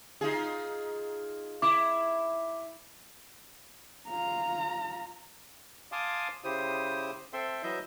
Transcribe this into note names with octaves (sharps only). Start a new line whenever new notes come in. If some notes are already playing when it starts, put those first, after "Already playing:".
D#4 F4 G#4
E4 D6
F4 A#5
F5 G#5 A5 C6 D6 D#6
C#3 E4 G4 C5 D#6
C4 A4 E5 G5 C6
E3 F#3 E4 D#5 E5 G6